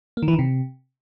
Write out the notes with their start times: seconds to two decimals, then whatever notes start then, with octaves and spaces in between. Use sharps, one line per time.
0.17 A#3
0.23 D#3
0.28 E3
0.33 D#3
0.39 C3